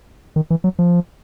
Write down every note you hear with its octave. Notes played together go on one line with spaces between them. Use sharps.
D#3
E3
F#3
F3